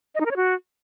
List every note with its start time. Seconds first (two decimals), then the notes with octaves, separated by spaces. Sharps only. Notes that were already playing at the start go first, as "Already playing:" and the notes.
0.15 D#5
0.20 D#4
0.26 A#4
0.31 C#5
0.36 F#4